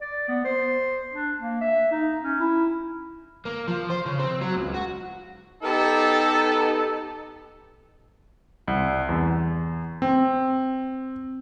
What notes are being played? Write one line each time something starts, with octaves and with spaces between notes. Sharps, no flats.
D5
B3
C5
D4
A#3
E5
D#4
C#4
E4
A#3
F3
C5
C#3
C4
F#3
C#2
F#4
B3 D#4 G4 A4
C2
E2
C4